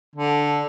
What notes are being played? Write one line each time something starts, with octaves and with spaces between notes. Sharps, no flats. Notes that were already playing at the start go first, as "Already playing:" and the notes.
D3